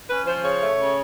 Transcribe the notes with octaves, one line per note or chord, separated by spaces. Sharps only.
C#4 B4
F3 C5
C#3 C#5
A3
C#3